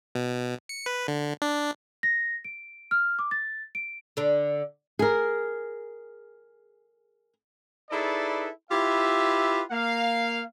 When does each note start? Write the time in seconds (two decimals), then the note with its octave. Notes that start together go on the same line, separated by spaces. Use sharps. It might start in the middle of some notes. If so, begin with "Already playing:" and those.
0.15 B2
0.69 C#7
0.86 B4
1.08 D3
1.42 D4
2.03 A#6
2.45 D7
2.91 F6
3.19 D6
3.31 A6
3.75 D7
4.17 D3 D4
4.99 G#4 A#4
7.91 D#4 E4 G#4 A4 B4 D5
8.71 E4 F4 G4 B4 E5
9.71 A#3 F5